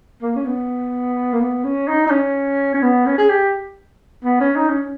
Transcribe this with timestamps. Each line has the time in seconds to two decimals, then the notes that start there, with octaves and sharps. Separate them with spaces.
0.22 A#3
0.35 C#4
0.45 B3
1.33 A#3
1.40 B3
1.64 C#4
1.88 D#4
2.07 D#4
2.11 C#4
2.74 C#4
2.82 B3
3.06 C#4
3.18 G#4
3.30 G4
4.24 B3
4.40 C#4
4.56 D#4
4.69 C#4